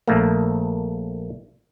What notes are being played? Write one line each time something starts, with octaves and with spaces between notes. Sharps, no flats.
A#1 A3 A#3